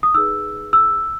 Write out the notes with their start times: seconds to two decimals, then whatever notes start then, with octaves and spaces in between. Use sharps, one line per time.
0.03 D#6
0.14 D#4 G#4 B4 E6
0.73 E6